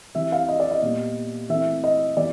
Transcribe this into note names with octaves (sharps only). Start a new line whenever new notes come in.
E3 G3 C4 E5
F5
D#5
D5
D#5
A#2 G3 B3
E3 A3 C4 E5
D#5
E3 G3 B3 D5